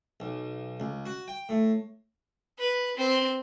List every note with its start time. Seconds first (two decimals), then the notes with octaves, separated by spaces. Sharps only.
0.20 B1
0.80 C#2
1.06 F#4
1.28 G5
1.49 A2
2.58 B4
2.97 C4